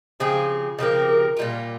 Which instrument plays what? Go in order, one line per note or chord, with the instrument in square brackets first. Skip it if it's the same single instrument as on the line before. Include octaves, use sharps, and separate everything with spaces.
[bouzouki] C#3 F3 C4 G4 [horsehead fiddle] G#4
[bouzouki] C#3 F3 C4 G4 [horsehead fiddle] A#4
[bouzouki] A#2 G3 A#3 F4